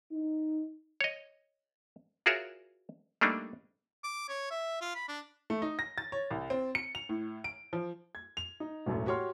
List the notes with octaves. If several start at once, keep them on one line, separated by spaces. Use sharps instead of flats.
D#4
C#5 D#5
F4 F#4 G#4 A#4 C#5 E5
G3 A3 A#3 D4 D#4
D6
C#5
E5
F4
B5
D4
A3
D#4
A#6
A6
C#5
C2
C4
C#7
F7
A2
D7
F3
G#6
F7
D#4
E1 A1 F#2 A3
F#4 G4 C#5 C6 F6